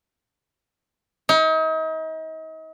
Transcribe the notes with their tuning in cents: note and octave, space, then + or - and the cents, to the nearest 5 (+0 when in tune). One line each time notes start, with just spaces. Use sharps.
D#4 +40